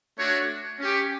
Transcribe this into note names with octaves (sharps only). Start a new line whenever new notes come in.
A3 D4 F#4 C#5
C#4 G4